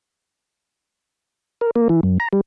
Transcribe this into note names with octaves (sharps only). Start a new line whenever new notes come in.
A#4
A#3
E3
F#2
A#5
G3